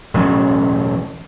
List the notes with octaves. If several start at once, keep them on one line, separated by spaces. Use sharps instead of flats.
E1 A1 F#3 C#4